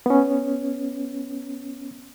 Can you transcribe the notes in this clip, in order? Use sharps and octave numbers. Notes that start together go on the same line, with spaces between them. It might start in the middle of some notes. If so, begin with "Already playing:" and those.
B3 C#4